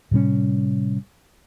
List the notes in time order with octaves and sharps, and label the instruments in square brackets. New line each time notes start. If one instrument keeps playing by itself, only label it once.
[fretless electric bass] A2 C3 G3 C#4